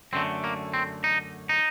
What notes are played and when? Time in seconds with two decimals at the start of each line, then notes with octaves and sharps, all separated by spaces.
0.13 F#2 D3 A3 C4
0.44 A#3
0.74 C4
1.04 D#4
1.49 D#4